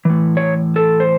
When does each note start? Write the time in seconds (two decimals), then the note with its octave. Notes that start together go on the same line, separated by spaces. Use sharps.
0.05 A2 E3
0.37 C#5
0.76 A4
1.00 C5